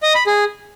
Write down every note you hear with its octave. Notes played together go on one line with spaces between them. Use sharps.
D#5
B5
G#4